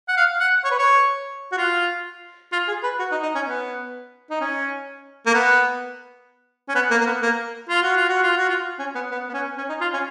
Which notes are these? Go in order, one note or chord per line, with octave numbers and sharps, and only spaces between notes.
F#5
F5
F#5
C#5
B4
C#5
F#4
F4
F4
G#4
B4
F#4
D#4
D#4
C#4
B3
D#4
C#4
A#3
B3
C#4
B3
A#3
A#3
B3
A#3
F4
F#4
F4
F#4
F4
F#4
F4
C#4
B3
B3
B3
C#4
C#4
D#4
F4
C#4